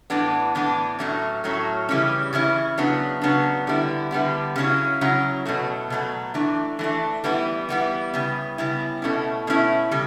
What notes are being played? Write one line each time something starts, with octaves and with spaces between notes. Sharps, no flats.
A2 E3 B3 D4
A2 E3 B3 D4
A2 F#3 A3 C#4
A2 F#3 A3 C#4
C#3 E3 G3 C#4 E4
C#3 E3 C#4 E4
C#3 F#3 B3 D4
C#3 F#3 B3 D4
D3 G3 B3 E4
D3 G3 B3 E4
C#3 F#3 C#4 E4
C#3 F#3 C#4 E4
B2 F#3 A3
B2 F#3 A3
E3 A3 D4
E3 A3 D4
E3 G3 B3 E4
E3 G3 B3 E4
C#3 G3 B3 E4
C#3 G3 B3 E4
B2 A3 C#4 E4
B2 A3 C#4 E4
C#3 G3